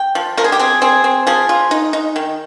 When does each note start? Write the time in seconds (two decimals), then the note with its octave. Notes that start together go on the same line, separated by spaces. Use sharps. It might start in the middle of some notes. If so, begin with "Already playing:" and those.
Already playing: G5
0.15 F3
0.37 F3 A#4
0.44 G#4
0.52 G4
0.59 C4 G#4
0.82 C4 G#4
1.04 C4
1.27 F3 G#4
1.49 F4
1.71 D#4
1.93 D#4
2.16 D#3